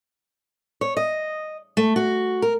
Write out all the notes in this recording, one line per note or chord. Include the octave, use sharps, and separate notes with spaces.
C#5
D#5
A3
F#4
A#4